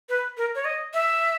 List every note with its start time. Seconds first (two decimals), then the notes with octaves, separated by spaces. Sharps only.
0.09 B4
0.37 A#4
0.55 C#5
0.65 D#5
0.94 E5